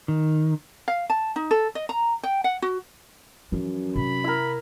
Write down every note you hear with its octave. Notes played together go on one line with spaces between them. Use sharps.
D#3
F5
A5
D#4
A4
D#5
A#5
G5
F#5
F#4
F#2 E3 F3
C3 B5
E4 A#4